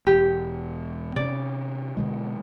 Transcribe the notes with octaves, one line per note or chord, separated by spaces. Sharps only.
E1 G4
C3 C#4 D5
B2 D3 G#3